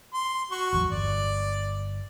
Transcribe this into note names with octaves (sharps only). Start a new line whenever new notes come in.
C6
F#4 C#6
A1 E2 F#3
G1 D5